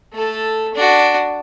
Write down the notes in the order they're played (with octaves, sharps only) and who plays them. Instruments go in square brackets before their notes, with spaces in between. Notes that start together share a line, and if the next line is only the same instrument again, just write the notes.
[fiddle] A3 A4
D4 F#4